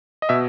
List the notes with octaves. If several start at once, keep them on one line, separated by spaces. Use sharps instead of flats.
D#5
B2 E5